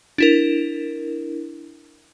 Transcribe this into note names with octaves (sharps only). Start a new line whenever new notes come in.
D4 E4 A#4